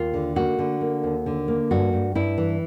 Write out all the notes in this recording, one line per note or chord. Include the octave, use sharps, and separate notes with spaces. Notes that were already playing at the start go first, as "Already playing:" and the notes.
Already playing: D#2 F4
D3
A#3 F#4
D3
A#3
D#2
D3
A#3
G2 F#4
G2
G2 E4
E3